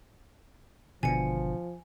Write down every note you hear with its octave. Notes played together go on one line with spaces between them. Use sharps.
G#1 B2 D3 F3 G#5 C#7